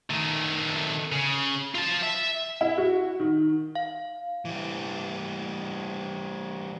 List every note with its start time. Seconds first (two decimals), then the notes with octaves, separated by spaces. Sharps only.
0.10 D#3 A3
1.12 C#3
1.75 F4 A5
2.03 E5
2.61 E4
2.78 F#4
3.20 D#3
3.75 F5
4.45 E3 G3